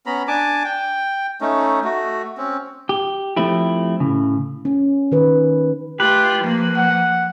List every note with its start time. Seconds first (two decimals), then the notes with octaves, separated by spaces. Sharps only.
0.06 B3 C#4 A#5 B5
0.28 D4 G#5 A5 D6
0.65 G5
1.41 A3 C#4 D#4
1.84 A3 F#4
2.37 C4 C#4
2.89 G4
3.36 F3 A3 C4 E4 G4
4.00 A2 C#3
4.65 C#4
5.12 D#3 B4
6.00 A3 F4 G4 B4
6.41 F3 A#3
6.77 F#5